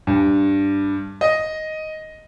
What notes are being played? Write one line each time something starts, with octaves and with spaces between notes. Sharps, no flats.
G2
D#5